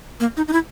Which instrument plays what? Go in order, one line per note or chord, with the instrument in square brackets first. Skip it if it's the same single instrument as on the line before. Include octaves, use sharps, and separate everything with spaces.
[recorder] A#3
D#4
D#4
E4